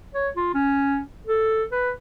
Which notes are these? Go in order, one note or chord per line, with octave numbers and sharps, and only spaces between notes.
C#5
F4
C#4
A4
B4